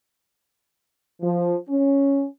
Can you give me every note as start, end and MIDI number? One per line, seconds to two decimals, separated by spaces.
1.21 1.55 53
1.68 2.25 61